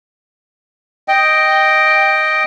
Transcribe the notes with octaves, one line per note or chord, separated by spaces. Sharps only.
D#5 G5